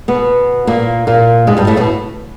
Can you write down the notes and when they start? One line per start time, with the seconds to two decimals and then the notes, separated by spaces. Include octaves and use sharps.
0.08 B2 B3
0.67 A#2 A#3
1.07 A#2 A#3
1.47 G#2 G#3
1.57 G2 G3
1.67 A2 A3
1.76 B2 B3